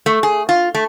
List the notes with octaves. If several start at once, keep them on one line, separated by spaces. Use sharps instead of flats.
A3
G#4
F4
A3